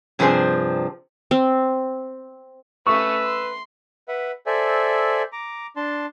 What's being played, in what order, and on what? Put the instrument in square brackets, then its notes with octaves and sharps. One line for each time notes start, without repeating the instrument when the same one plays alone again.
[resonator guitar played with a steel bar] G2 C3 F3 D4 G#4 C5
[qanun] C4
[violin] A3 C#4 [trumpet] B4 [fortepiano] C#6 [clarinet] E6
[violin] C6
[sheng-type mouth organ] B4 E5 F#5
A4 C5 D5 E5 G#5
A#5 D6
D4 A5 C6